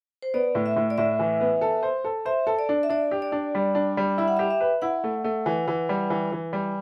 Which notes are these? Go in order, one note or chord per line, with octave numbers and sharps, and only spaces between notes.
C5
B3 D5
A2
E5
A2
D5
A2 E5
E3
B3
A4
C5
A4
C5 E5
A4
D5
D4
E5
D4 D5
G4
D5
D4
G3
D4
G3
E4 E5
F#5
G4 E5
E5
B4
E4 F#5
A3
A3
E3
E3
G3
E3
E3
G3